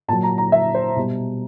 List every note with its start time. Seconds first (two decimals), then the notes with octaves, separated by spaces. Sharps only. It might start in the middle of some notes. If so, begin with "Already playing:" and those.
0.08 A#2 A5
0.13 F#3
0.23 A#5
0.38 A#5
0.52 E5
0.74 C5
0.96 B2 G3